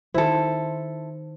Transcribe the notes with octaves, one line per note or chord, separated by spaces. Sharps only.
D#3 E4 A4 C5